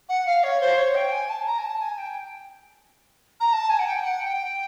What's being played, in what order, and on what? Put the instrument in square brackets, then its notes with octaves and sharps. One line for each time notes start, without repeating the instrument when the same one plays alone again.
[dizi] F#5
F5
C#5
C5
C#5
G5
G#5
A5
A#5
G#5
A5
G#5
G5
A#5
A5
G#5
F#5
G5
F#5
G5